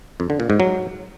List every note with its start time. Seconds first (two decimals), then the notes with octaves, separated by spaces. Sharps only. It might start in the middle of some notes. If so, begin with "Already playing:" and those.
0.20 F2
0.30 D3
0.40 A#2
0.50 G#2
0.60 F#3